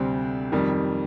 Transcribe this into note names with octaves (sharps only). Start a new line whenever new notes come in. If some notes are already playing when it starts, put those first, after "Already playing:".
Already playing: D2 C3 G3 C4
F2 D#3 G3